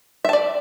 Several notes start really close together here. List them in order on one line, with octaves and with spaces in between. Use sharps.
E5 A5 D5